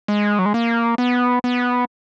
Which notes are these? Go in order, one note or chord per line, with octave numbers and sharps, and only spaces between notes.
G#3
F#3
G#3
A#3
B3
B3